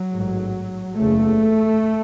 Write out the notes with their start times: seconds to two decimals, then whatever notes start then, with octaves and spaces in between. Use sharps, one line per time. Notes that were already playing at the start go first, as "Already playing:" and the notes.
Already playing: F#3
0.14 A1 G#2
0.96 F#1 E2 C#3 A3